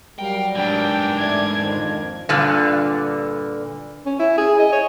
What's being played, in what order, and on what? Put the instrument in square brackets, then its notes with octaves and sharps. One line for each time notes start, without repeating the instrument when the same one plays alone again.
[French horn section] F#3 G3 [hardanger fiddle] A#4 F5 [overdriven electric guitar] G5
[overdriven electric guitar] G#2 E3 [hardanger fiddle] D4 A#4 [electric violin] G5
[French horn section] A3 D5 [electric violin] G#6
[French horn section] F2 D#3
[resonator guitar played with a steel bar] G2 A#2 D3
[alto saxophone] C#4
E4
G#4
D#5
C#5